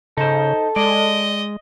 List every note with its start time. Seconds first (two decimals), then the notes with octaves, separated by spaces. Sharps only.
0.17 C#3 D#4 A4 C5
0.76 G#3 D5 D#5